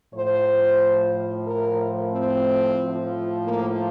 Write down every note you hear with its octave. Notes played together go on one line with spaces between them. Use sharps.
A2 F3 C5
A#4
C4
A2 F3
A#3